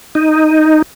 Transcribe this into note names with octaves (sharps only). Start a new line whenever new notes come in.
D#4